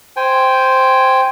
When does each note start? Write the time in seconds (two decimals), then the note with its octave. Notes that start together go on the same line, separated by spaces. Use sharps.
0.16 C5 G5 G#5